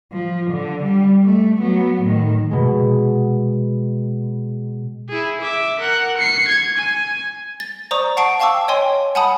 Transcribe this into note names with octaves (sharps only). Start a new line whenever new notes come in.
F3
D3
G3
A3
F#3 B3
A2 D#3
B2 G#3
E4 G#4
E5 D6
A#4 F#5
C7 C#7
G#6
G#5
A6
C5 D5 A#5 C#6 D#6
F#5 A5 C#6 C7 D7
F5 G5 A5 C#6 D6 E6
C#5 D#5 G5 G#5 C6
F#5 G#5 A5 B5 D#6